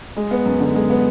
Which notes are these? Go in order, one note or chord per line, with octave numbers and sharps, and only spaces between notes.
G#3
B3
F#2
D3
G#3
B3